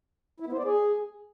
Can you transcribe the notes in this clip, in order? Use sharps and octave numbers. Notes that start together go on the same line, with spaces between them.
E4
B3
C5
D5
G#4